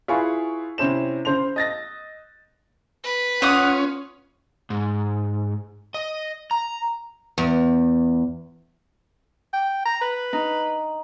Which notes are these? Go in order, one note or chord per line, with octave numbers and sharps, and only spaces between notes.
E4 F4 G#4 B4 G#5 C#6
C3 C#4 E4 C5 E7
C#3 C5 C6 F7
D#5 A6 A#6
B4
C#4 F4 F5 F#5 D#6
G#2
D#5
A#5
E2
G5
A#5
B4
D#4